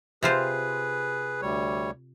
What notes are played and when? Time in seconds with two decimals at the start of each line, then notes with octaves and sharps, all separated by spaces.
0.23 C3 F4 G#4 B4 C5
1.42 D2 G3 C#5